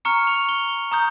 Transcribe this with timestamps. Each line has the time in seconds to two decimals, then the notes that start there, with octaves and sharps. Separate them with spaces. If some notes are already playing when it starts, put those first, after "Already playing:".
0.05 A#5 C#6 F6 C#7
0.27 F7
0.49 G7
0.92 A#5 D#6 G6